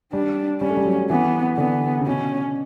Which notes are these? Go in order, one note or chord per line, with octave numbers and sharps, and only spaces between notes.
G3 D4
G3 C#4
A3
G3
F#3
E3 B3
D3 B3
C#3
B2 C#4